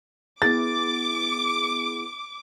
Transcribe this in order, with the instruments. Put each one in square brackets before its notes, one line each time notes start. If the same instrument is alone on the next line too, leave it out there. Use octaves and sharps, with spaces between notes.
[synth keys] B3 E4 G#4 [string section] D6 [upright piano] A6